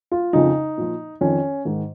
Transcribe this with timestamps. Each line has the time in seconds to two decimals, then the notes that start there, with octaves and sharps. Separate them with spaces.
0.12 F4
0.33 F2 C#3 F3 D#4
0.77 A#2 F3
1.21 F2 D#3 C#4
1.65 G#2 D#3